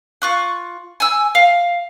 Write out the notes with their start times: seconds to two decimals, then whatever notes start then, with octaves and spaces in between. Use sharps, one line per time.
0.22 F4 C#6 F#6
1.00 G#5 E6
1.35 F5